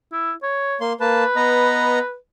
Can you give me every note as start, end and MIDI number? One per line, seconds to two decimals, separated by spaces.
0.12 0.33 64
0.43 0.78 73
0.81 0.93 58
0.81 0.93 84
1.01 1.24 58
1.01 2.15 71
1.01 1.24 81
1.36 1.99 59
1.36 1.99 75
1.36 1.99 82